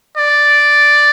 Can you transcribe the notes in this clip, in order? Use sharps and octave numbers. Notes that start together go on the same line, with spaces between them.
D5